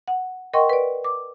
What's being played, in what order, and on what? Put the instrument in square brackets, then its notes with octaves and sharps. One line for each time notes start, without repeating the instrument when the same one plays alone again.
[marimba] F#5
A#4 D#5 F#5 G5 C6 C#6
B4 D5
D6